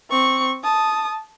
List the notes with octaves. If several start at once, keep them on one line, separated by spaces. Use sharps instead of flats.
C4 C#6
A5 D#6